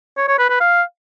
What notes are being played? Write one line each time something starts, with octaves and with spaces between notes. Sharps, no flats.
C#5
C#5
B4
B4
F5